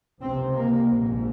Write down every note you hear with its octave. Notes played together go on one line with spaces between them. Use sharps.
C#2 C3 C4
A#3
A#1 G#2